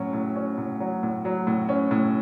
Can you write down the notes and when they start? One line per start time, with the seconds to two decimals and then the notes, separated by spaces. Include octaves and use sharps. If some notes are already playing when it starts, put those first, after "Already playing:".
Already playing: A2 F#3 C#4
0.13 A2
0.36 C#4
0.58 A2
0.80 F#3
1.03 A2
1.25 F#3
1.47 A2
1.69 C#4
1.91 A2